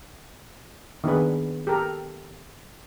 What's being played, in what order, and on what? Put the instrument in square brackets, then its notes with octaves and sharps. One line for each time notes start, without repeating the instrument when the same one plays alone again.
[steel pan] D#3 B3 D4 G#4 B4
G4 A4 A#4